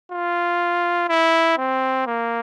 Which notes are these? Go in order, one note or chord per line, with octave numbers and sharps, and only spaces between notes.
F4
E4
C4
A#3